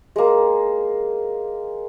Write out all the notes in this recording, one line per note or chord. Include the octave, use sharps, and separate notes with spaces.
G#3 A#3